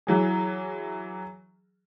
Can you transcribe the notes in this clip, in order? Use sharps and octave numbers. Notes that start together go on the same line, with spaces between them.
E3 F#3 G#4